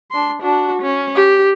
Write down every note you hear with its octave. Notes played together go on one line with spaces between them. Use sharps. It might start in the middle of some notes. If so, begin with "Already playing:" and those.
D4 C6
D4 F#4
C#4
G4